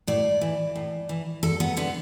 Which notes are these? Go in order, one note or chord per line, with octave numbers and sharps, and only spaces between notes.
A2 D5
E3
A2
E3
E2 A4
B3
D3 B3